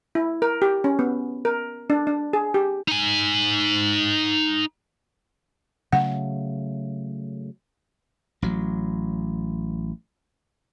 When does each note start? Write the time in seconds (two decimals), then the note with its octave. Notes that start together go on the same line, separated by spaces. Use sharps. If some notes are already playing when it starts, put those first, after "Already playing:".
0.15 E4
0.42 A#4
0.62 G4
0.84 C#4
0.99 B3
1.45 A#4
1.90 D4
2.07 D4
2.33 G#4
2.54 G4
2.88 D#4 G#5
5.93 C#3 F#3 A3 F#5
8.42 A1 F#3